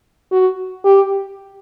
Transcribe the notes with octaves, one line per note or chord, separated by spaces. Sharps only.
F#4
G4